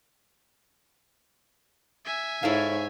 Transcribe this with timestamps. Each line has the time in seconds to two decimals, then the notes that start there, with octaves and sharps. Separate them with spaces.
2.05 E5 G#5
2.43 G#2 E4 A4 C#5 F5